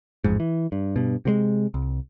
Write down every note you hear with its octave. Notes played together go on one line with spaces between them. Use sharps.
A1 F2 G#2
E3
G2
G2 B2
C3 F3 G#3
C2